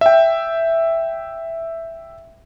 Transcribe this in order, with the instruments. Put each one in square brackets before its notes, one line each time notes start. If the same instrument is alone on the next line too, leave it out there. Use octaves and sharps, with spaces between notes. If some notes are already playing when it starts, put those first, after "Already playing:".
[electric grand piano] E5 G5